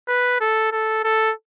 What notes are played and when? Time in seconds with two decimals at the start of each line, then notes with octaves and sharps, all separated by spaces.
0.08 B4
0.41 A4
0.72 A4
1.04 A4